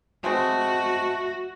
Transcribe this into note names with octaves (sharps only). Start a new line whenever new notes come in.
G#3 A3 C4 F#4